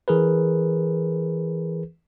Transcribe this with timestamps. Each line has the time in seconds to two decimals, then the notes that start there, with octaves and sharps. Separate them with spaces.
0.08 E3 G#4 A#4 B4